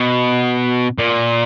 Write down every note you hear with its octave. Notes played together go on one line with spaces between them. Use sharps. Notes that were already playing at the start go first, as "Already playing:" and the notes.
Already playing: B2
A#2